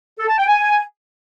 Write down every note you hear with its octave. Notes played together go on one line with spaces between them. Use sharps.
A4
A5
G5
G#5